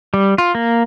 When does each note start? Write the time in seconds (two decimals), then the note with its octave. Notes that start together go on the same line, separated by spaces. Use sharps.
0.14 G3
0.38 F4
0.55 A#3